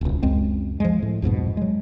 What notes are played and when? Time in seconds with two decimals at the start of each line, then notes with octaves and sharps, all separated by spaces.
0.01 D#1 C#2
0.23 C#2 F#2 G#3 C4
0.80 F3 G#3
1.03 A2
1.22 B1 F2 G#2 B2
1.57 F#3 G#3